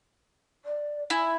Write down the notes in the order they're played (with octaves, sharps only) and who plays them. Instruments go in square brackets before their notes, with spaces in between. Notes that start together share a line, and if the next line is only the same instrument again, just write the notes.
[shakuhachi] D5
[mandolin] E4 [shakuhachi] G#5